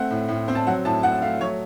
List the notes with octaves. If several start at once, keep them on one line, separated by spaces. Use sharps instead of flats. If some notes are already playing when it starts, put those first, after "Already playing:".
Already playing: A3 C4 F#5
A2
A2
C4
A5
F#3 F#5
A2 A5
A2 F#5
A3 F5
F#3 C#5